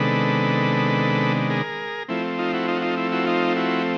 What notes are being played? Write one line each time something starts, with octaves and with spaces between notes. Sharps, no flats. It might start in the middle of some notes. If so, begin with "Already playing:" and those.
Already playing: C3 D#3 G#3 B3 D4 A4 B4
G#4 A#4
F3 A3 C4 E4
D#4 F4
E4 F#4
D#4 F4
F#4
D#4 F4
E4
E4 F#4
D#4 F4
E4 F#4